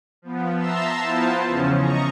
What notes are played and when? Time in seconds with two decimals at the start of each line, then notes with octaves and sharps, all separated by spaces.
0.22 F3 B3
0.57 E5 A5 A#5 C6 E6
1.02 B3 E4 F4 C5 A5
1.46 E2 C#3 F3 C#4
1.78 D#5 A#5 C#6